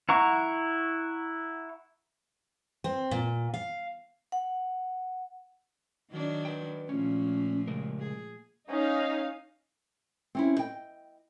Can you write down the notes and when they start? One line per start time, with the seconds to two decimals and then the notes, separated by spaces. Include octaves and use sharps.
0.09 E4 F#5 A#5 C#6
2.84 C4
3.11 A#2
3.54 F5
4.32 F#5
6.11 D#3 F#3 D4
6.45 B4 G5
6.89 A#2 F3 A3 C#4
7.67 C#3 G#3 A#4
7.99 G#4
8.69 C#4 D#4 F5
10.35 C4 C#4 E4
10.57 D#5 G5